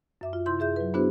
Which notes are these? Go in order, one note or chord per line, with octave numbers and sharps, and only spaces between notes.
F#2 E5 D6
F4
C3 E4 C6 G6
F#2 G#4 E5 G6
F#3 B4
B3 D4 E4 F#4 G#4 C5